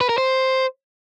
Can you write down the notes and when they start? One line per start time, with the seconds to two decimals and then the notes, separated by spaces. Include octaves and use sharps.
0.01 B4
0.09 A#4
0.18 C5